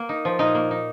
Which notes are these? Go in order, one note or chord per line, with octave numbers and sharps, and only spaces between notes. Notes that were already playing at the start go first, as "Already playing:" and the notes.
Already playing: A#3
D#4
F3
A#2 D#4
A#3
D#4